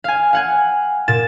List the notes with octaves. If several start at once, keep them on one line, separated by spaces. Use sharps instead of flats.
F5 G#5
F5 F#5 G#5
A#2 A6 E7